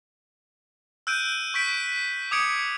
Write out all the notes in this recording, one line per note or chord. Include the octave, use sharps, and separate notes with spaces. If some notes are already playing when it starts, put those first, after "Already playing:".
E6 F#6 G6 D7 D#7
C#6 G6 B6 D7
D6 D#6 G#6 C#7 D7